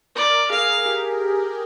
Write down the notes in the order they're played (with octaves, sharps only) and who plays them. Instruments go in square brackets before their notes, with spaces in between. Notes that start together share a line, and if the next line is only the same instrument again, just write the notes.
[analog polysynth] A#4 [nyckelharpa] D5
[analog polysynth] G#4 [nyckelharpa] F5
[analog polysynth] G4